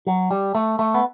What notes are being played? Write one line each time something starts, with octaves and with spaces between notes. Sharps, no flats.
F#3
G3
A3
A3
B3